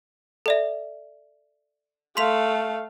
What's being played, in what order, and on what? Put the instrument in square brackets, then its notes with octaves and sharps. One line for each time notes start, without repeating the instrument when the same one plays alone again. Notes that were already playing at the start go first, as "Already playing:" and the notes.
[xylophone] A4 D5 E5
[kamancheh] A3 F5 [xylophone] C6 B6 F7